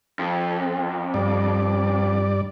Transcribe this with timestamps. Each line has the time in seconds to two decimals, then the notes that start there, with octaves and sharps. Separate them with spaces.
0.19 F2
1.14 G2 D5